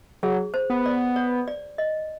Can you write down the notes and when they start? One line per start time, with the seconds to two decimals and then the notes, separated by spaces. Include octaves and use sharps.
0.23 F#3 G#4
0.54 C5
0.70 B3
0.86 D5
1.16 C#5
1.48 D5
1.78 D#5